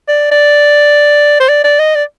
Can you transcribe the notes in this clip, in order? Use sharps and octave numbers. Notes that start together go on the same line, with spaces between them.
D5
D5
C5
D5
D5
D#5
D5